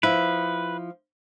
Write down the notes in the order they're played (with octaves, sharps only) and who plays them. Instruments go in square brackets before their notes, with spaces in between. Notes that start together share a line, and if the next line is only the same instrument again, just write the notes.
[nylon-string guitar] F3 E4 [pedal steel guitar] B4